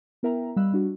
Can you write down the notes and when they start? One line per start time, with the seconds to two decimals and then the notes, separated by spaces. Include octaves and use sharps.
0.23 B3 E4 A#4 E5 G5 A#5
0.56 G3 D#5 F5 B5 E6 F#6
0.72 G3 D4 F#4